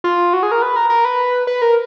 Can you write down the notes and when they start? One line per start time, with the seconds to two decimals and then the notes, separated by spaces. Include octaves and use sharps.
0.04 F4
0.33 F#4
0.43 G#4
0.52 A#4
0.62 B4
0.76 A#4
0.90 A#4
1.05 B4
1.47 B4
1.62 A#4